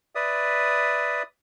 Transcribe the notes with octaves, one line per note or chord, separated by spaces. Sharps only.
B4 D5 E5 D#6